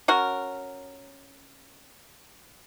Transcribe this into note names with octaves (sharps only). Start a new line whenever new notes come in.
C#4 F#4 A#4